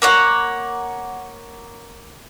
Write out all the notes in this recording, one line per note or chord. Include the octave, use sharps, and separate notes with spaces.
A#3 C#5 F#5